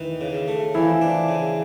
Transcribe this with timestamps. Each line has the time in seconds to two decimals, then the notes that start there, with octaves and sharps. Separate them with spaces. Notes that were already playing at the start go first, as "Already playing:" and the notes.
Already playing: D#3 E3 D#4
0.21 C#3
0.48 A3
0.74 E3 F3 E4
1.01 D4
1.28 C#3